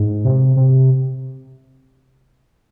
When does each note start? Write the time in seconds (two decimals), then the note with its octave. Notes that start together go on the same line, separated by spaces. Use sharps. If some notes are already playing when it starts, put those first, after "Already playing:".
Already playing: G#2
0.25 C3
0.56 C3